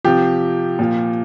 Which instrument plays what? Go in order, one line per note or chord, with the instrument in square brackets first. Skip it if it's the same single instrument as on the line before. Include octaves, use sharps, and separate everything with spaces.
[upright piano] C3 F3 G4
A#2 F3